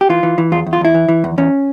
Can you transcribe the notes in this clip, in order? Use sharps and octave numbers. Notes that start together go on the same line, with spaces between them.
G4
E3 F4
E3
E3
E2 F4
E2
F4
E2 E4
E3
E3
E2
E2 C#4